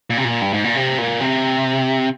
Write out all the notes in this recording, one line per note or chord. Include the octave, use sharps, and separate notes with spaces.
A#2
C3
A#2
G2
G#2
A#2
C3
A#2
C3